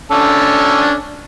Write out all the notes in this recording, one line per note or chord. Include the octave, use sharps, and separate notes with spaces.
C#4 D4 A4